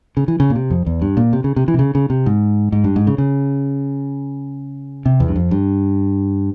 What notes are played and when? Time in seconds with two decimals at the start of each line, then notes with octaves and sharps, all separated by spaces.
0.17 C#3
0.28 E3
0.40 C#3
0.50 A#2
0.55 C3
0.70 F2
0.86 E2
1.02 G2
1.17 A#2
1.33 C3
1.44 C#3
1.56 C3
1.68 E3
1.74 C3
1.79 C#3
1.95 C#3
2.10 C3
2.26 G#2
2.72 G#2
2.84 G2
2.96 G#2
3.07 C#3
3.18 C#3
5.06 C3
5.20 E2
5.28 G2
5.36 F2
5.51 G2